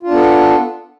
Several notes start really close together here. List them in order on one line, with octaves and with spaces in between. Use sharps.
F4 D4 B3 A4